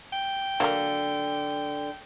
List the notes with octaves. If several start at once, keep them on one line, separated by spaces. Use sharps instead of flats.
G5
D3 F3 F#3 A#3